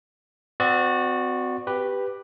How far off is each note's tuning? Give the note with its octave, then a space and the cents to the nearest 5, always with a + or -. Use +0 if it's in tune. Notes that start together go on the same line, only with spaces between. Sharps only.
C4 -35 F#4 -15 D5 +15
G4 +5 B4 +0